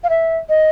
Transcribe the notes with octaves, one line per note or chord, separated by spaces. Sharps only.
F5
E5
D#5